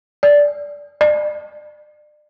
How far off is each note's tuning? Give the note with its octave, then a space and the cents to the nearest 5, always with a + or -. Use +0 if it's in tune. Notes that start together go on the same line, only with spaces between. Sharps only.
D5 -10
D5 +35